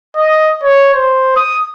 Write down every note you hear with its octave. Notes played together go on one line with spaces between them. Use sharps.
D#5
C#5
C5
D#6